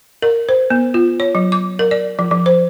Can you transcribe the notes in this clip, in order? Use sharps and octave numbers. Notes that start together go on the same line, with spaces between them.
A#4
C5
B3
F4
C#5
F#3
D6
A#4
D5
F3
F3
C5